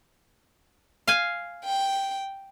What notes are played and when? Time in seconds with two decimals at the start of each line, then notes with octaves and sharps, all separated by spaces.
1.08 F5 G#5
1.65 G5